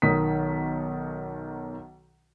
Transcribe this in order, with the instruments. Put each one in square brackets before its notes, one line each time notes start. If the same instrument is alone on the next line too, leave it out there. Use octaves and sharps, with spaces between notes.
[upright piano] B1 D#3 D#6 B6